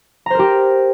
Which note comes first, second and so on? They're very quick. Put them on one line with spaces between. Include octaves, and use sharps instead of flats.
A#5 C5 A#4 G4